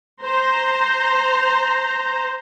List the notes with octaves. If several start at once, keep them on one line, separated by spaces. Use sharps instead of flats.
C5 A#5